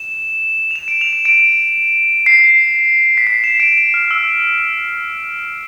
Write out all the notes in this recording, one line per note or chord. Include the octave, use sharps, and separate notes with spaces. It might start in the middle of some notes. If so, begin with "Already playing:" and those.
Already playing: E7
F7
E7
D7
F7
E7
D7
C7
B6
C7
E7
D7
E7
F6
E6